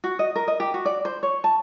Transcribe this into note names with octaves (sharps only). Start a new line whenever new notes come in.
F#4
D#5
A#4
D#5
G4
F#4
D5
C5
C#5
A5